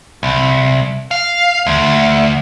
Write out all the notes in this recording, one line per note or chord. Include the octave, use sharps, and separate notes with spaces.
C2
F5
D2